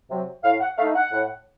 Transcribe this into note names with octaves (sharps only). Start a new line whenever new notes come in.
C3 F#3
A2 F5
F#5
A3 D#4 F5
F#5
A2